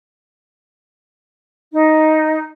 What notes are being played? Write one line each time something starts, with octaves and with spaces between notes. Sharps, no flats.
D#4